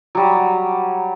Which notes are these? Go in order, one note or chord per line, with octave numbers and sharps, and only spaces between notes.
F#3 G3